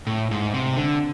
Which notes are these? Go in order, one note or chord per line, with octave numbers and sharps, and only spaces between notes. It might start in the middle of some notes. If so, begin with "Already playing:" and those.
A2
G#2
C3
D3